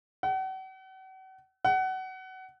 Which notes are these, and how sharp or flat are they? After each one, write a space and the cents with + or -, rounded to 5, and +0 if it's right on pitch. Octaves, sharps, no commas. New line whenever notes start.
F#5 +40
F#5 +25